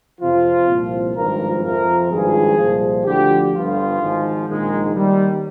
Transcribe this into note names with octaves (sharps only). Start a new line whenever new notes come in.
F2 C3 F3 F4
C2 A#2 F3
G#1 G2 F3 A#4
F2 C3 F3 A#4
G#1 G2 F3 G#4
C2 A#2 F3
D2 D3 F3 G4
G1 G2 D3 F3 F4
G#1 G#2 F3
A#1 G#2 D#3 G#3
D#2 D#3 G3